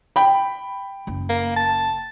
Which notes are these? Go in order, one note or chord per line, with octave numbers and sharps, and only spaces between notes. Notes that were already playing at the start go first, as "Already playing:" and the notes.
G5 B5
F#1
A#3
A5